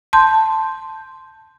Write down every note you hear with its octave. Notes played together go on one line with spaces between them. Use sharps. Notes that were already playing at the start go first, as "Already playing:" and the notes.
A5 C6 G6